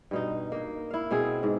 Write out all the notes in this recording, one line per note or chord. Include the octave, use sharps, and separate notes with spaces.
G2 B2 D#4
A#3 D#4
E4 F5
B2 B3 C4 G#4
G#2